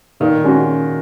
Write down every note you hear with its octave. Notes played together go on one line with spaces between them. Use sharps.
A#2 D#3
G#3 C#4 F#4